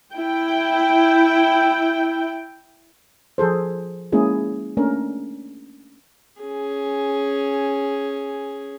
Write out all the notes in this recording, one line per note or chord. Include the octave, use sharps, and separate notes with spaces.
E4 G5
F3 G#4 A4 C5
G#3 A#3 C#4 E4 G#4
A3 A#3 C#4 D4 A#4
C#4 G#4